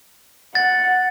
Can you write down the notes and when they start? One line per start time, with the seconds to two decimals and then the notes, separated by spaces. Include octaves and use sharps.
0.55 F#5 A6